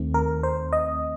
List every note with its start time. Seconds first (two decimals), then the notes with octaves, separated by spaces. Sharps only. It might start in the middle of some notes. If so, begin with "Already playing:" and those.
Already playing: D#2 D#3 A3 C4
0.14 A#4
0.43 C5
0.73 D#5